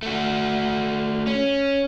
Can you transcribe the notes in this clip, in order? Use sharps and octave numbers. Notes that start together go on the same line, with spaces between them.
A3 F#4
C#4